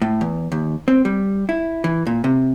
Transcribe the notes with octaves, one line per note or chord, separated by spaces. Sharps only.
A2
E2
D#2
C4
G3
E4
E3
A#2
C3